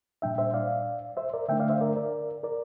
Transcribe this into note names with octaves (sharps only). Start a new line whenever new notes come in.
A#2 G3 D4 E5 G5
C5 E5
D5 F5
C5 E5
A#4 D5
D3 A3 D4 E5 G5
D5 F5
C5 E5
A#4 D5
A#4 D5
A#4 D5